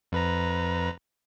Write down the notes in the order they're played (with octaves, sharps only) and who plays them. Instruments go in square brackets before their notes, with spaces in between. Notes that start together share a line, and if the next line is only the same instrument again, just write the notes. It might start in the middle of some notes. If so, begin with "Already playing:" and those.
[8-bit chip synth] F2 B4 A#5